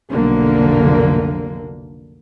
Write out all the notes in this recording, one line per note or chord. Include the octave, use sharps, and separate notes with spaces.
F1 B1 D3 A#3